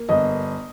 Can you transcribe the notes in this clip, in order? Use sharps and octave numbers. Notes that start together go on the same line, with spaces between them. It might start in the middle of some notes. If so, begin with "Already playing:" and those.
Already playing: A#3
G1 D#5